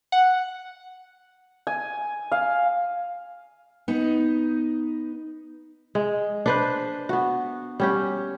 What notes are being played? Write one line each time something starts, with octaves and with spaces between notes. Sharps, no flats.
F#5
G#5
F5
B3 D#4
G#3
D4 B4 C5
B3 F#4
G3 C#4 G4